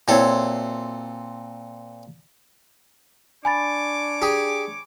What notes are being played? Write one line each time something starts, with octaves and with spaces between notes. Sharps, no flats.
A#2 C4 E4 F#4 A4 C#5
D4 C#5 G#5 B5 D6 A6
G4 G#4